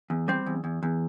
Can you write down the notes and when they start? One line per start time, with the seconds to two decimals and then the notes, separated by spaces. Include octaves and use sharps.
0.10 E2
0.28 G3 C4
0.46 E2
0.64 E2
0.83 E2